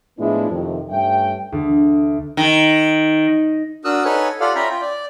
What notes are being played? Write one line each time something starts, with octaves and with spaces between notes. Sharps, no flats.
A2 F3 G#3 B3 D4 E4
F2 C3 D#3
G2 A3 C#4 E5 G5
D2
D#3
D4 F#4 A#4 D#6 E6 F#6
D#4 A4 B4 C#5 F#5 G#5
F4 G4 A4 D5 F5 F#5
C#4 F4 E5 G5 A#5 B5
F4 G5
D5